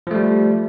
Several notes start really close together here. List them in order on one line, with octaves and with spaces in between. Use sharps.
F3 A3 G3